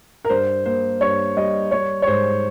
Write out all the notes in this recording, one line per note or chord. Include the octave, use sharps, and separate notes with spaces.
A#4
G2 C5
A#3 C5
G2 C#5
G3 D#5
G3 C#5
C#5
G#2 C5